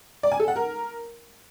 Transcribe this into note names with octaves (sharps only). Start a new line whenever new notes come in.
D5
G#5
A4
F#5
A#4